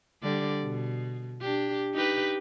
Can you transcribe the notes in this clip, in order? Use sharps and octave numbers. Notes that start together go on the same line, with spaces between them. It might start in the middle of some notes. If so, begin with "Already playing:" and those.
D3 G3 D5
B2
D4 G4
D#4 G4 B4